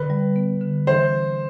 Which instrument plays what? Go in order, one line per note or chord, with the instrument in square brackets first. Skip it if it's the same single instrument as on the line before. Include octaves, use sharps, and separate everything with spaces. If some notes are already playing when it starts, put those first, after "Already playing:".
Already playing: [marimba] D3 [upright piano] B4
[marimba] G3
B3
D3
[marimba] E3 [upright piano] C5